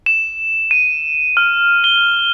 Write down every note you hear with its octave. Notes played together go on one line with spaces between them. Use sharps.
E7
D#7
F6
G7